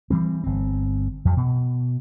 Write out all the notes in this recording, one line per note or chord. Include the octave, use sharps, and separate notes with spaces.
E3 G3 C4
G1 C4
F2 F3 F#3
B2